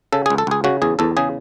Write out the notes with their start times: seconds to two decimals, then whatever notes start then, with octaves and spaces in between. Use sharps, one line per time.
0.12 C#3 A4
0.26 G#4
0.30 C#2
0.38 A4
0.47 C#2 G#4
0.64 C#3 F#4
0.82 E2 G#4
0.99 E2 A4
1.17 C#3 G#4